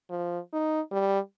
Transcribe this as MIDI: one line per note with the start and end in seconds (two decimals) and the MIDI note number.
0.10 0.39 53
0.53 0.81 63
0.92 1.19 55